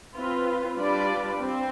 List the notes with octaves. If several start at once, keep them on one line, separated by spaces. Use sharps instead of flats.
C4 F4 B4
G3 D4 F4 B4 D5
C4